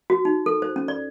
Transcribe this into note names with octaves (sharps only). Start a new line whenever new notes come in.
F#4
D#4
A4
C5
C#4
D5